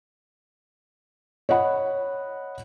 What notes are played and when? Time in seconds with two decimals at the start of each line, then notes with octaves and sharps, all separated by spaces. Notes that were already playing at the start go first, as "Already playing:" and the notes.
1.49 C#5 D#5 F#5 B5